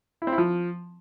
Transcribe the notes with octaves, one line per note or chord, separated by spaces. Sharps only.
E4
C4
E4
F3